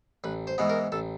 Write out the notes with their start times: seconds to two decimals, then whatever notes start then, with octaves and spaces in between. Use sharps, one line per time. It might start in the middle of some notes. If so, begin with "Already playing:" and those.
0.24 A1 B4
0.47 C5
0.58 G#2 E3 G#3 B3
0.70 A#4
0.92 A1 A4